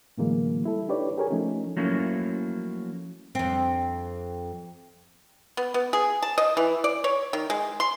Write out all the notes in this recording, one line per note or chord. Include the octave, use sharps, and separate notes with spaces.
A2 D3 E3 F#3 G#3 A#3
G3 E4 A4
D4 D#4 G4 B4 C#5 D5
G4 G#4 A#4 C#5 G#5
F3 A3 C#4 D#4
F3 F#3 A3 A#3 C#4 E4
F2 C4
B3
B3
G#4
A5
D#5
E3
D5
C#5
D#3
G#3
C6